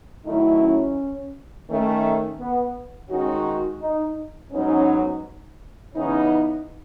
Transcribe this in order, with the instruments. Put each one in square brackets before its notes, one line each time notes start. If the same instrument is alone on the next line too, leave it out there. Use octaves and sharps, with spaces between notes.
[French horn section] D#3 F#3 A3 E4 [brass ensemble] D#4
[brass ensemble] C#4
[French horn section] D#3 A3 C#4
[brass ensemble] B3
[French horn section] D#3 G#3 D#4 F#4 [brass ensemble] C#4
[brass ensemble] D#4
[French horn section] G#2 F#3 B3 D#4 [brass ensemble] C#4
[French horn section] C#3 E3 B3 D#4 [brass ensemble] C#4